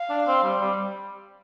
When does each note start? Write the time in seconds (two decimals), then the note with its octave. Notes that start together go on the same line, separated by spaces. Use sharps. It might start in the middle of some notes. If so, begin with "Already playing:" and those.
Already playing: F5
0.10 D4
0.27 C4
0.44 G3
0.61 G3